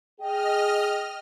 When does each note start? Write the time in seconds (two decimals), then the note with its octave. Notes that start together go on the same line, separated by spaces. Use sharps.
0.20 G#4 D#5 G5 F6